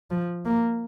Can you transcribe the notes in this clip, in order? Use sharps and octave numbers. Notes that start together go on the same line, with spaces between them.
F3
A#3